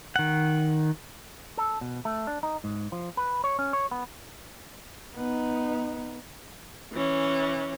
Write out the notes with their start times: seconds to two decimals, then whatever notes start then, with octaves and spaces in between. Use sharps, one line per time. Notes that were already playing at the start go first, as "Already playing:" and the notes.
0.16 D#3 F#5
1.57 A4
1.81 B2
2.05 A3
2.27 D4
2.43 D#4
2.64 G#2
2.92 F3
3.17 B4
3.44 C#5
3.59 C#4
3.73 C#5
3.91 B3
5.16 B3 D#4
6.93 E3 C#4